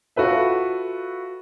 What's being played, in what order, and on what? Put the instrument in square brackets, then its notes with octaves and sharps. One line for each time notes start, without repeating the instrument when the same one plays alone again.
[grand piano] F4 F#4 A4 B4 E5